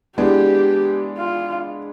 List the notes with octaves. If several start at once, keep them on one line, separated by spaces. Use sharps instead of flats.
E3 G#3 B3 D4 G4
F4